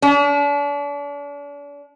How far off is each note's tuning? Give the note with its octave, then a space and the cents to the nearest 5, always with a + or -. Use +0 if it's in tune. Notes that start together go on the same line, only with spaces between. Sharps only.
D4 -40